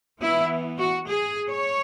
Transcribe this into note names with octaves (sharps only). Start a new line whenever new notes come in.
E3 B3 E4
F#4
G#4
C#5